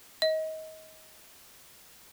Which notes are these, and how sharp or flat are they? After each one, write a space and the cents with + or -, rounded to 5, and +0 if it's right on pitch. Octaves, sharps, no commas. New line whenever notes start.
D#5 +25